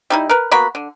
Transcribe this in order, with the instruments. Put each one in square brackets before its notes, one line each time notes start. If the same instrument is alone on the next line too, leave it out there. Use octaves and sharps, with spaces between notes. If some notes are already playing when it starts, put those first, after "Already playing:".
[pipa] G3 D#4 E4
A#4 B4
A#3 B3 F#4 B5
D3